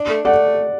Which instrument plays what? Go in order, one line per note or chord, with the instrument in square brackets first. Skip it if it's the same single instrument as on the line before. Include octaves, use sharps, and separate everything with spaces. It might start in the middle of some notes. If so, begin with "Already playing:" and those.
Already playing: [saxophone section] D4
A3
[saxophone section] A3 [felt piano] D5 F#5